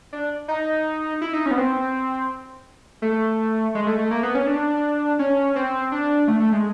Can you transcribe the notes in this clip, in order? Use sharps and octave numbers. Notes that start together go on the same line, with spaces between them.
D4
D#4
E4
D#4
C#4
B3
C4
A3
G#3
A3
A3
A#3
B3
C#4
D4
C#4
C4
D4
A3
A3
G#3